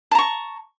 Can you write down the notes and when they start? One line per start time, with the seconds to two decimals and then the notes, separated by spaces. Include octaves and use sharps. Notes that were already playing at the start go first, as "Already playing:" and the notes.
0.11 A5
0.15 A#5
0.19 C#6